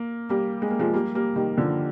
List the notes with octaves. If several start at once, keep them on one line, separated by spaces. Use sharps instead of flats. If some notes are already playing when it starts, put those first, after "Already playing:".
Already playing: A#3
G3 A#3
G#3
A#3
F3 G#3
G3 A#3
G3 A#3
D#3 G3
D3 F3